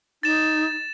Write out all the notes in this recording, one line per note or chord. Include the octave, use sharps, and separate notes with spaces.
D#4 A6 E7